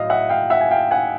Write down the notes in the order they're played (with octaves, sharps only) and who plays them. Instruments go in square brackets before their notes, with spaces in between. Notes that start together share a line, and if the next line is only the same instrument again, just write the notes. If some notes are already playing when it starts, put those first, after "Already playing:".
Already playing: [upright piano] A2 F#3 D#5 F5
E5 F#5
F5 G5
E5 F#5
G#5
F5 G5
F#5 G#5